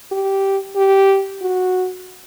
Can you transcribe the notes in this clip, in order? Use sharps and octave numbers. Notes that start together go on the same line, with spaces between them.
G4
G4
F#4